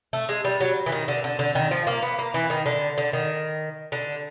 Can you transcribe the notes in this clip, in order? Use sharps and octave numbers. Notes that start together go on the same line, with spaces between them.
A3
G#3
G3
F#3
E3
D#3
D3
D3
D3
D#3
F3
A#3
B3
A#3
E3
D#3
D3
D3
D#3
D3